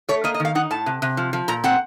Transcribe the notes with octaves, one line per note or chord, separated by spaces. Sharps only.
A3 C#5
A#3 D#5
D#5
D#3
F5
D#4 F#5
A2 A5
C3
C3
F3
F3
A#2 A#5
C4 F#5